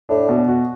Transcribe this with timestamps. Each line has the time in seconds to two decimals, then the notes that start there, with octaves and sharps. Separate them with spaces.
0.09 A2 D4
0.29 B2
0.48 F#4